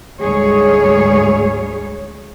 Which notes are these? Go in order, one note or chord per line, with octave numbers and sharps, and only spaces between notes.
D2 G#2 G3 G#4 C#5